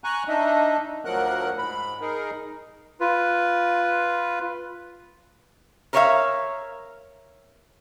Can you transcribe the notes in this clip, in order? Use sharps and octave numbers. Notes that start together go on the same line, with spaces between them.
G#5 A#5 C#6 F#6
D4 D#4 D#5 E5
D2 F3 F#3 A#4 F#5 F#6
G#2 B5
D#4 G#4 A#4
F4 B4
A#4 B4 C#5 D5 E5 F5